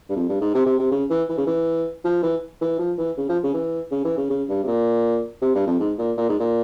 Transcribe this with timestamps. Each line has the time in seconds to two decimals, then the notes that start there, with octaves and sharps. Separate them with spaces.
0.09 G2
0.16 F2
0.29 G2
0.41 G#2
0.54 C3
0.66 C3
0.79 C3
0.91 C#3
1.10 E3
1.29 E3
1.38 C#3
1.47 E3
2.05 F3
2.23 E3
2.61 E3
2.79 F3
2.98 E3
3.17 C#3
3.29 F3
3.44 C#3
3.54 E3
3.91 C#3
4.05 E3
4.17 C#3
4.30 C#3
4.49 G2
4.63 C3
4.67 A#2
5.42 C3
5.55 G2
5.67 F2
5.80 G#2
5.99 A#2
6.17 A#2
6.29 G#2
6.40 A#2